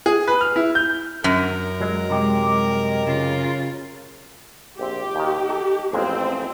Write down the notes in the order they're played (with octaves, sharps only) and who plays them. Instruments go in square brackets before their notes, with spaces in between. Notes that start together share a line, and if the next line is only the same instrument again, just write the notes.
[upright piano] G#4
B4
F6
E4
G6
[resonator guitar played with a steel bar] F#2 [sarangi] A#4
[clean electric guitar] F#3 G#3
[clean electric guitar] C3 D#4 G4 [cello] G#3
[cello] C#3 F4
[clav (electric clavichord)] A#1 C4 [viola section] G4
[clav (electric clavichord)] D#2 D#3
D#4 A4
[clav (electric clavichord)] A1 F2 G#3 [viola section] C4